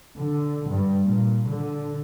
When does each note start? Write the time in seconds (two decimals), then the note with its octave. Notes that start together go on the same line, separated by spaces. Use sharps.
0.16 D3
0.68 G2
1.04 A#2
1.48 D3